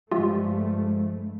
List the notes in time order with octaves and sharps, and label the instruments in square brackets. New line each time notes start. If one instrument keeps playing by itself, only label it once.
[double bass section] G2 A3 [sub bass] F3 [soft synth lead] G#3 [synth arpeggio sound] F4 G4 E5